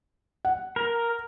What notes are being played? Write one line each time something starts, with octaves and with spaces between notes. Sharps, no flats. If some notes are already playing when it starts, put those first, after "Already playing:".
F#5
A#4